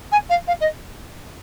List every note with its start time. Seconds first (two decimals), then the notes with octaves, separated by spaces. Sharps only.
0.11 G#5
0.29 F5
0.47 F5
0.60 D#5